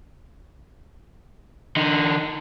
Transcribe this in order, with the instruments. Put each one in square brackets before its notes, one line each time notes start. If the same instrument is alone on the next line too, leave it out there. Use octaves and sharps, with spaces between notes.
[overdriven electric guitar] D3 D#4